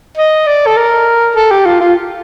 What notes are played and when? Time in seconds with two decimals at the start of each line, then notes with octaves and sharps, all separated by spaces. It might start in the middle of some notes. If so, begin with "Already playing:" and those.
0.17 D#5
0.47 D5
0.67 A4
0.77 A#4
1.36 A4
1.51 G4
1.66 F4
1.81 F4